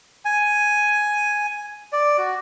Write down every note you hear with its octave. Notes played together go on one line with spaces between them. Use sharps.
G#5
D5
F#4